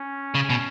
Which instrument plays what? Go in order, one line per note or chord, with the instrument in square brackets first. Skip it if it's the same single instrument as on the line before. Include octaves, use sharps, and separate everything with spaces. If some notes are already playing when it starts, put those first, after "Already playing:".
Already playing: [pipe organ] C#4
[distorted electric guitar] C#3
B2